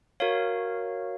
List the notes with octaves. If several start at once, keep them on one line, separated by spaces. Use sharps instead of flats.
F#4 A#4 C#5 F5